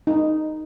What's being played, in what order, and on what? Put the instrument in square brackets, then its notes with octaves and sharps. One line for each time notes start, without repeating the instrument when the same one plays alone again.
[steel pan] D#4